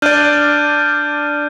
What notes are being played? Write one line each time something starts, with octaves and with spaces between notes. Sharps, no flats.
D4 D5 F6 G6 D#7